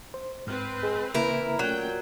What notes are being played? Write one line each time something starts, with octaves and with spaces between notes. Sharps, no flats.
C5
G#2 C4 B4 F6
G#3
C#3 E3 A#3 E4 A#4
A#2 F#3 A3 C#4 G5